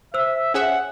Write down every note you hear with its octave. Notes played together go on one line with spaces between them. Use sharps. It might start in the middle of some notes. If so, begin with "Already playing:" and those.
C5 E5 E6
C#4 G#4 E5 F#5